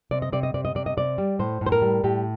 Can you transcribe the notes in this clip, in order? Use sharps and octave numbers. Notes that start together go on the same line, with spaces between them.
C3 D5
D#5
C3 D5
D#5
C3 D5
D#5
C3 D5
D#5
C3 D5
G3
A2 C5
A2
C5
A#4
G3
A2 G4